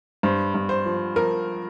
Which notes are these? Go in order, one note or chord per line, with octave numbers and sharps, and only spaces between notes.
G2 C5
G2
C5
F3
F3 A#4